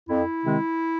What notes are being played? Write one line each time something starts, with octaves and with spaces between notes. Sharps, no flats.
F2 E4
C3 D#3 G#3 C4